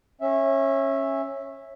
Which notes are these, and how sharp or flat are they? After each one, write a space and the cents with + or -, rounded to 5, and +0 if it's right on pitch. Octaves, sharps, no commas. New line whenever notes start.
C#4 -20 E5 +0